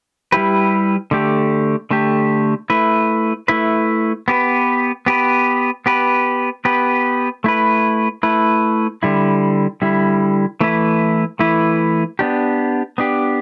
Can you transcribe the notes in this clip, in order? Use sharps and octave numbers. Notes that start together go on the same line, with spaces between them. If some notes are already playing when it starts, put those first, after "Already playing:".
G3 E4 G4 B4
D3 A3 G4
D3 A3 G4
A3 E4 B4
A3 E4 B4
B3 G4 B4
B3 G4 B4
B3 G4 B4
B3 G4 B4
A3 E4 B4
A3 E4 B4
D3 G3 E4
D3 G3 E4
E3 A3 E4 B4
E3 A3 E4 B4
B3 D4 G4
B3 D4 G4